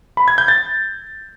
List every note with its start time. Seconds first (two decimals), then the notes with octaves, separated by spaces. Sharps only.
0.17 B5
0.28 G#6
0.38 G6
0.48 A6